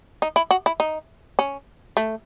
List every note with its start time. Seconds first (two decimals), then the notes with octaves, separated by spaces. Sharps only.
0.22 D#4
0.36 E4
0.51 F#4
0.66 E4
0.80 D#4
1.39 C#4
1.97 A3